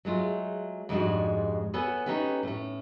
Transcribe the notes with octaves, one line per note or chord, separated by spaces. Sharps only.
F#3 G#3 A3 F4
F2 G#2 G3 G#3 D4 F#4
B3 A4 C#5 F#5 G#5
C#4 D#4 F#4 G4 A4 B4
A2 C#4